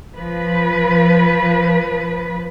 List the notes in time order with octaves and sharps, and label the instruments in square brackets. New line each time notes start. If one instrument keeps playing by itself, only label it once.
[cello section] F3 B4